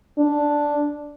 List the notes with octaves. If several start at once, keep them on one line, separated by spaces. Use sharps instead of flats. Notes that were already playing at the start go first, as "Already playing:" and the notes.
D4